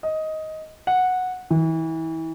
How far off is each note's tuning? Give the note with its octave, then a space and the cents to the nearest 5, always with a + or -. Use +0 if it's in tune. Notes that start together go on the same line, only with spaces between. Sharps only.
D#5 +10
F#5 -10
E3 -30